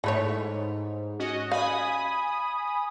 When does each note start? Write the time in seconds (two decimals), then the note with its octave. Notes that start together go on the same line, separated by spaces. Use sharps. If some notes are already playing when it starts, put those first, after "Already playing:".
0.04 G#2 E3 A3 C#5
1.19 C#4 F#4 D#5
1.51 F5 G#5 B5 D#6